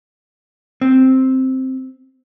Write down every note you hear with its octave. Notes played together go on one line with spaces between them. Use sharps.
C4